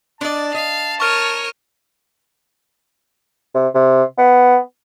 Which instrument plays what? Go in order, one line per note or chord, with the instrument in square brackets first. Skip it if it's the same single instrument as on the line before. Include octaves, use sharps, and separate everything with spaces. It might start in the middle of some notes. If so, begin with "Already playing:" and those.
[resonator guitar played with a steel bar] D4 D#5 [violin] D5 [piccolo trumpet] A5
[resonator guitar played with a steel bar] D#5 [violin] F5
[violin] A#4 C#5 [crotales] C#6 F6 D#7
[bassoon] C3
C3
B3